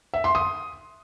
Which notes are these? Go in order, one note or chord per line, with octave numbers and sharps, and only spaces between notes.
E5
C6
D#6